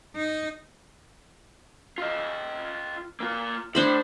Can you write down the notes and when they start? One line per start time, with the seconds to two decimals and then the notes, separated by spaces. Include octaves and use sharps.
0.16 D#4
1.98 F4 D#5
3.20 A#3 F4
3.75 A2 D4 C5 B5